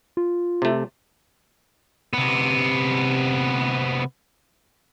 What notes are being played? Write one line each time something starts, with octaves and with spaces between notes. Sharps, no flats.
F4
C3 A3
C3 B3